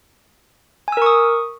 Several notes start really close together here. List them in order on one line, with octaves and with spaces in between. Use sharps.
G#5 E6 A#4 C#6 D#6